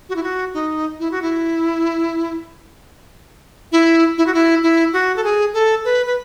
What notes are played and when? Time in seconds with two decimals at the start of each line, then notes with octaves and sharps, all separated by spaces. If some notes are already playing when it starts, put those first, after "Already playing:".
0.09 F#4
0.16 E4
0.23 F#4
0.54 D#4
1.00 E4
1.11 F#4
1.22 E4
3.72 E4
4.18 E4
4.27 F#4
4.34 E4
4.63 E4
4.93 F#4
5.16 A4
5.24 G#4
5.54 A4
5.85 B4
6.06 B4